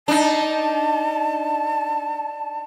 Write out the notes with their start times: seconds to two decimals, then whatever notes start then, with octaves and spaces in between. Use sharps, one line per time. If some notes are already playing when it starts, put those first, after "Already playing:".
0.08 D4 D#4 A5